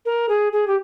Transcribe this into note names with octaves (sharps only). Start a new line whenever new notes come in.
A#4
G#4
G#4
G4